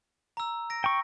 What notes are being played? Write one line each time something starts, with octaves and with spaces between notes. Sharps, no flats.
A#5 E6
A#6 D7
G5 C#6